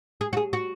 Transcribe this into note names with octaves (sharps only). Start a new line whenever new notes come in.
G#4
F#4
G#4
F#4